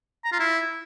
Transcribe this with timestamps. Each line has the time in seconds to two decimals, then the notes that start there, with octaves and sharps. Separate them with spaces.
0.25 A#5
0.32 F4
0.40 E4